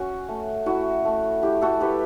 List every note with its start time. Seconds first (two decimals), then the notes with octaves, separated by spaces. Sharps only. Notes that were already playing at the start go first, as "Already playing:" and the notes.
Already playing: C#4 F#4
0.28 A3
0.66 E4 F#4
1.05 A3
1.42 E4 G4
1.61 F#4 A4
1.80 E4 G4 B4